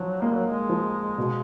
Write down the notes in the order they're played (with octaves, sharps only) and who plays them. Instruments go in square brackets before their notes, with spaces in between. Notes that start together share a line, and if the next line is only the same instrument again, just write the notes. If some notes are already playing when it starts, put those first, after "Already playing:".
Already playing: [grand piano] F3 [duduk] F#3
[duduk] G#3 [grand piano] A#3
[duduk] F#3
G#3
[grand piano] F3
B2